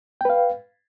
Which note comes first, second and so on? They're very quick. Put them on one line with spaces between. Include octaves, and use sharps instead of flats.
G5 B4 F5